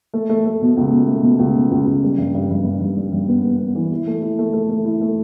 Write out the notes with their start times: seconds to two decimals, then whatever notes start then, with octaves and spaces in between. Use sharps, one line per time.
0.14 A3
0.29 A3
0.46 A3
0.62 B2
0.77 C#2
0.92 B2
1.08 A3
1.23 B2
1.39 C#2
1.56 B2
1.71 C#2
1.86 C#2
2.03 G3
2.18 G2
2.34 G2
2.50 G2
2.65 G2
2.80 G2
2.97 G3
3.12 G2
3.28 B3
3.43 B3
3.59 B3
3.75 E3
3.92 E4
4.07 A3
4.22 E4
4.39 A3
4.53 A3
4.70 A3
4.85 E4
5.01 A3